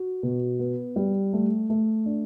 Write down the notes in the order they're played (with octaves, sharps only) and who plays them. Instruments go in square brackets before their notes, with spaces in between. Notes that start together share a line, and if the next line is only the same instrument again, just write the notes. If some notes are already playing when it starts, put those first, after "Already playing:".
Already playing: [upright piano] F#4
B2
B3
G3
A3
A3
D4